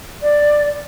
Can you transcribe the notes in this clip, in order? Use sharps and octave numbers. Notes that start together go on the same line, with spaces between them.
D5